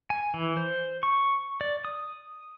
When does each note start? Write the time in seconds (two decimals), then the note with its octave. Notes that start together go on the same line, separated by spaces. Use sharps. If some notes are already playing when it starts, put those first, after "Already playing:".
0.10 G#5
0.34 E3
0.57 C5
1.03 C#6
1.61 D5
1.85 D#6